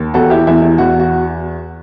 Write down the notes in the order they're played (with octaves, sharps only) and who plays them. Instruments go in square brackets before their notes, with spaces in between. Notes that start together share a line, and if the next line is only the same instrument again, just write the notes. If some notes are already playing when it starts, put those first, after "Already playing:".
Already playing: [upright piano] D#2
E2 F#4 A4
E4 G4
E2 E4
E4
E2 F#4
F#4